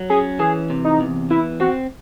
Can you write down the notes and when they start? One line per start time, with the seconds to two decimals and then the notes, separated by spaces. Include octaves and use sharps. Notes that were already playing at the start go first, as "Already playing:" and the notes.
Already playing: F#3
0.10 C#4 G#4
0.39 E3 G#4
0.70 C3
0.85 D#4
1.00 E2
1.30 E3 E4
1.60 C4 F#4